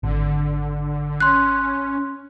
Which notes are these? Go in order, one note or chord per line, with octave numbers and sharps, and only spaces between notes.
G#1 D3
C#4 C6 F#6